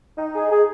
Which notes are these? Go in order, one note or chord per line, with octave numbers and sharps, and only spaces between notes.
D#4
G#4
G#4